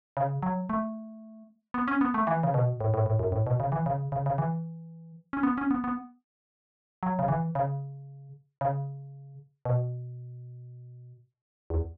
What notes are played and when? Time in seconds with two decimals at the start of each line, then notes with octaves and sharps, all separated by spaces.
0.17 C#3
0.43 F#3
0.70 A3
1.74 B3
1.88 C#4
2.01 B3
2.14 A3
2.27 E3
2.43 C#3
2.54 B2
2.81 A2
2.94 A2
3.06 A2
3.19 F#2
3.32 A2
3.47 B2
3.60 C#3
3.72 E3
3.86 C#3
4.12 C#3
4.26 C#3
4.38 E3
5.33 C#4
5.43 B3
5.58 C#4
5.71 B3
5.84 B3
7.03 F#3
7.19 C#3
7.28 E3
7.55 C#3
8.61 C#3
9.65 B2
11.70 E2